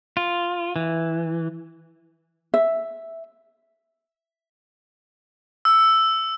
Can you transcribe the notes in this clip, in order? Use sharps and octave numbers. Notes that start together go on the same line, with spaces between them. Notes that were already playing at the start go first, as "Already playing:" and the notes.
F4
E3
E5
E6